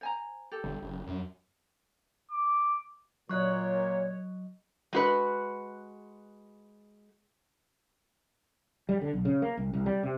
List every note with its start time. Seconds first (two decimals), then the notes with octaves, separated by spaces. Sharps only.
0.01 C5 G#5 A#5
0.52 G4 A4
0.64 G1
0.82 F#1
1.07 F#2
2.31 D6
3.29 A#2 F#3 C#5 D#5 C#6 F#6
4.93 G#3 F#4 B4
8.89 G3
9.01 D3
9.13 B1
9.25 C#3
9.42 A#3
9.57 C2
9.73 C2
9.86 G3
10.03 C3